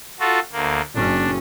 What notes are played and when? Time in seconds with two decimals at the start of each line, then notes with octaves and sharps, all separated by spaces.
0.20 F4 F#4 A4
0.52 D2 A#3
0.95 F#1 C#4 D4